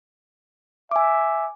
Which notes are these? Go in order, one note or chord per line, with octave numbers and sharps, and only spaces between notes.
E5 G#5 D6